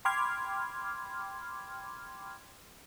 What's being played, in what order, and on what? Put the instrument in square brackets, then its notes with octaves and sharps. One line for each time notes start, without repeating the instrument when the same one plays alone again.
[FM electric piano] G5 B5 C6 D6 F6 G#6